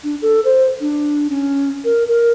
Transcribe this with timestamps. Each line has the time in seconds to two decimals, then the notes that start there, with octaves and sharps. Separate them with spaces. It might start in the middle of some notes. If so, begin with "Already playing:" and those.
0.04 D4
0.22 A4
0.45 C5
0.80 D4
1.30 C#4
1.85 A#4
2.08 A#4